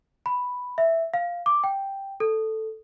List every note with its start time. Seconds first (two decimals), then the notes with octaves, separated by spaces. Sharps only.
0.26 B5
0.78 E5
1.14 F5
1.46 D6
1.64 G5
2.20 A4